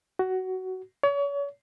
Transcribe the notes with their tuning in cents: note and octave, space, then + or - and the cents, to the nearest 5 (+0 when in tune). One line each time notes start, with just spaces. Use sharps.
F#4 +15
C#5 +35